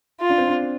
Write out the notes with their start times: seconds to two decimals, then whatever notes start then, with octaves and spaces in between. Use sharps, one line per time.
0.21 F4
0.30 D4
0.38 C4
0.47 D4